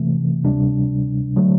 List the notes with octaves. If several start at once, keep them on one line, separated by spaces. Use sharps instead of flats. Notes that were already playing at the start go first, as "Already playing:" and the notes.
Already playing: C3 E3 A3
D2 C3 G3 D4
D3 F#3 A3